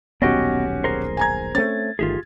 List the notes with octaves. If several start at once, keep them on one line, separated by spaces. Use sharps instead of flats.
D#1 B1 B3 C#4 F#4 G4 D#5 G5
G#4 A#4 C5
G#5 A#5 G#6
A3 C4 C#4 A6
G1 D#3 A3 F4 G4 G#4